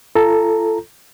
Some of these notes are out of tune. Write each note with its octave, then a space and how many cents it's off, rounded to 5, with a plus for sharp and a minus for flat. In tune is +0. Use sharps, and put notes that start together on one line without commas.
F4 -40 A4 +0 A#5 +0